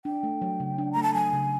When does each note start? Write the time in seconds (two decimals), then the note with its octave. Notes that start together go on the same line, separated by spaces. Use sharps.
0.05 D4 G5
0.23 A3
0.42 F#3
0.60 C#3
0.78 D4
0.92 A3 A#5
1.03 A5
1.14 F#3 G#5
1.33 C#3